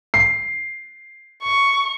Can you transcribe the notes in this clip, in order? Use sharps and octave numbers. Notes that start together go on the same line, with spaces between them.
C7
C#6